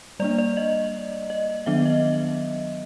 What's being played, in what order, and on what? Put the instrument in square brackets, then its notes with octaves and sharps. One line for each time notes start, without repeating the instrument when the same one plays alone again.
[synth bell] G3 A#3 D4 D5
D5
D#5
D#5
D#3 F#3 B3 D4 E5
D#5